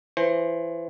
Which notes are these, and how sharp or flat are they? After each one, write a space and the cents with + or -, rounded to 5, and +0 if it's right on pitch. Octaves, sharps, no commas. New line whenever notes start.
E3 +25 C5 +20